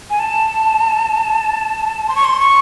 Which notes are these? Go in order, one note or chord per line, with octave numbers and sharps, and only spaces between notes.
G#5
A5
C6
C#6
C6
C#6